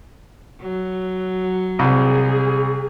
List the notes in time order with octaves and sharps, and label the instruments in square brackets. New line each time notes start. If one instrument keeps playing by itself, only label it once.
[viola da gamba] F#3
[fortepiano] C2 [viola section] G#4